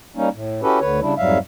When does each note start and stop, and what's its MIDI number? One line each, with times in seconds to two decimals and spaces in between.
0.16 0.29 55
0.16 0.29 58
0.16 0.29 61
0.16 0.29 63
0.34 0.61 45
0.62 0.80 61
0.62 0.80 64
0.62 0.80 66
0.62 0.80 67
0.62 0.80 69
0.62 0.80 71
0.80 1.00 38
0.80 1.00 50
0.80 1.00 71
0.80 1.00 73
1.01 1.14 49
1.01 1.14 55
1.01 1.14 62
1.01 1.14 64
1.17 1.38 41
1.17 1.38 44
1.17 1.38 54
1.17 1.38 55
1.17 1.38 76
1.17 1.38 77